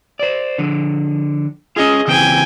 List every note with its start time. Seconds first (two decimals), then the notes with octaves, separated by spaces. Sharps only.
0.19 C5 D5
0.58 D3 F3
1.76 C#4 F4 G#4 D#5
2.08 C#3 E3 C4 G5 G#5